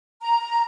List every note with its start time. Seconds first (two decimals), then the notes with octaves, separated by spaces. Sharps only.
0.22 A#5